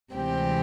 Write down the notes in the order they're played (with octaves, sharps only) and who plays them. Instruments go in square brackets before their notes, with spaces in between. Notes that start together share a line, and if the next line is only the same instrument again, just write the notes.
[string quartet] D2 C3 E3 G#3 C4 G4